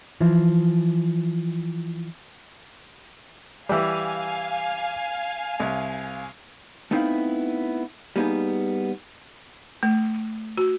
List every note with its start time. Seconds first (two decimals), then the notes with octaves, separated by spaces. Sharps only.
0.21 E3 F3
3.69 E3 G3 F5 G#5
5.60 C2
6.91 A3 B3 C4 D#4 E4 F5
8.16 G3 A#3 B3 D#4 G#4
9.83 A3
10.57 F#4